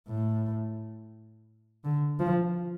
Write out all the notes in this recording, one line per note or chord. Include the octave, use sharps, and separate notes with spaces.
A2
D3
F3